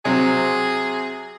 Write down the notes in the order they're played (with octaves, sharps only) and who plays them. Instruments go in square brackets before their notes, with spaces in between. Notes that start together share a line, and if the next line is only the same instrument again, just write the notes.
[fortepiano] C3 F#3 C4 [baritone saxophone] G#4